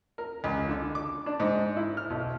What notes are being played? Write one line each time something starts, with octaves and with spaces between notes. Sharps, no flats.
A#4
C#2
D3
D6
D4
G#2
E4
F6
B1